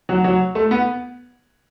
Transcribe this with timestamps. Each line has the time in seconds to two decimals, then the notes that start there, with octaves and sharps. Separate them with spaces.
0.09 F#3
0.24 F#3
0.55 A3
0.71 B3